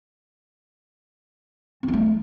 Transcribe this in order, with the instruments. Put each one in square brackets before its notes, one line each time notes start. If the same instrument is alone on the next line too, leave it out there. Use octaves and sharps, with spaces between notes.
[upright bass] C4
E4
A3